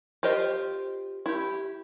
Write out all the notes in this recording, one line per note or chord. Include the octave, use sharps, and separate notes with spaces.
F4 G4 A#4 C5 D#5
E4 G4